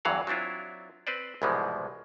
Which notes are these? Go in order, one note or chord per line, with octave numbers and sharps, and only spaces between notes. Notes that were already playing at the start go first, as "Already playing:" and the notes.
E2 G2 E3 F#3 F5 F#5
F#3 C4 D4 E4 F4
C4 B4 C5 D5
C2 G#2 B2 E3 F3 G#3